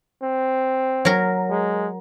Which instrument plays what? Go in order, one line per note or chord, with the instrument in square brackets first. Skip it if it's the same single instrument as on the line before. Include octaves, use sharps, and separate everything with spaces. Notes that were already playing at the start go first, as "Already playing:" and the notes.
[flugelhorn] C4
[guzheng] F#3 A#4
[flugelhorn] G#3